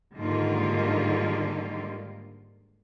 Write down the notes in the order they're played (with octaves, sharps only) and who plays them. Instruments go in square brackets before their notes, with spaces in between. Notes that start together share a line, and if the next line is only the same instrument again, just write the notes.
[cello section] G#2 D3 D#3 G3 A#3 F4